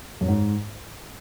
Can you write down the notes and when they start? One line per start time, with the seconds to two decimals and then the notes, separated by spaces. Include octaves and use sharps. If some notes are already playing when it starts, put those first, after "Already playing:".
0.21 F#2
0.28 G#2